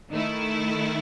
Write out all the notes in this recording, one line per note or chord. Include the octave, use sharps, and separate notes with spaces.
D#3 A3 E4